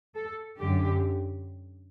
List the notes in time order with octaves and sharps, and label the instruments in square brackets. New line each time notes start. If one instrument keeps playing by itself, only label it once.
[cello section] A4
F#2 D3 F#3 G4